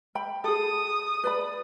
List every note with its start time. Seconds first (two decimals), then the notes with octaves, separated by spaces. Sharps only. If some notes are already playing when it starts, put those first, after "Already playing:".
0.15 G5 B5
0.44 G#4 A4 D#6
1.24 B4 D5 B5